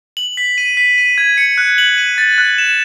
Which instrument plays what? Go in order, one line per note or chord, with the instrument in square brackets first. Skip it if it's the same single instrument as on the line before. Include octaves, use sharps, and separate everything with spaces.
[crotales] F#7
B6
D#7
B6
D#7
G#6
C#7
F#6
F#7
D#7
A6
F#6
E7